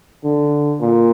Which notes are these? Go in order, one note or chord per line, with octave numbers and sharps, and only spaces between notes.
D3
A#2